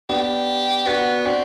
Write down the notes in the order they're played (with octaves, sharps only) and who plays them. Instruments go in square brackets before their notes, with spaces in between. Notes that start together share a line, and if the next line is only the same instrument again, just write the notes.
[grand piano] B3 D4 [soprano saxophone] G4
[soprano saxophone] B3 [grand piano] D4 F#4
[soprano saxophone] C4 [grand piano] D4 F#4